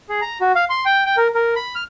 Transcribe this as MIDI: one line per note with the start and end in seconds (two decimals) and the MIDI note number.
0.09 0.20 68
0.21 0.38 82
0.41 0.52 66
0.55 0.65 77
0.70 0.84 84
0.85 1.05 79
1.05 1.16 79
1.17 1.28 70
1.35 1.54 70
1.56 1.75 83
1.75 1.84 89